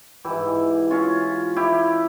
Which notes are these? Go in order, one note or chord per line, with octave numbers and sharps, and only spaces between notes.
G#2 E3 E4 G4
C#4 F4
E4 G4